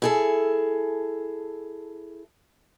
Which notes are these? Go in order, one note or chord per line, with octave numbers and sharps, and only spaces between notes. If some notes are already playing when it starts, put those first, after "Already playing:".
E4 G#4 A4